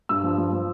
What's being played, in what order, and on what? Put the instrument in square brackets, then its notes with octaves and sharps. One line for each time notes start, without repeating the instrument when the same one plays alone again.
[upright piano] G2 E6
F3
F3
F3